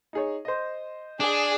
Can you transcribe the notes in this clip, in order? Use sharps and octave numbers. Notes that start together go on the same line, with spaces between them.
D#4 G#4 C#5
C5 D#5
D4 G#4